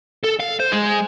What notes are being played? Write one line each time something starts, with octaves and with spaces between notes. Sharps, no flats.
A4
F5
C5
G#3